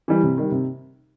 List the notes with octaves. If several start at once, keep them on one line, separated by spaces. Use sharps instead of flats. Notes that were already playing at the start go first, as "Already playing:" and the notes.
E3 G3
C3
D#3 G3
C3